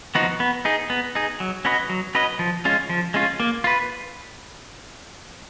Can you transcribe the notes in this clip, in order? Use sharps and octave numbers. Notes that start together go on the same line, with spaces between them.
F3 B3 D#4 F#4
B3
D#4 G#4
B3
D#4 G#4
F#3
C#4 F#4 B4 D#5
F#3
C#4 F#4 B4 D#5
F3
G#3 C#4 F4
F3
G#3 C#4 F4
A#3
F4 B4